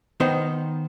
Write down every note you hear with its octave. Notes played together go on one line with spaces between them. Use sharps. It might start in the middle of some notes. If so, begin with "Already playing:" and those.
D#3 B3 D#4 C5